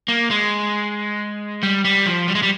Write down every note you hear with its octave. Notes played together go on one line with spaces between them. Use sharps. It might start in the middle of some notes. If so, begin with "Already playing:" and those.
A#3
G#3
G3
G3
F3
G3
G#3
G3